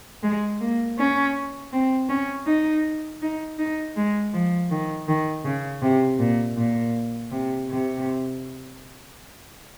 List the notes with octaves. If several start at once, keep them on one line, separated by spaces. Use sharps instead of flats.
G#3
A#3
C#4
C4
C#4
D#4
D#4
D#4
G#3
F3
D#3
D#3
C#3
C3
A#2
A#2
C3
C3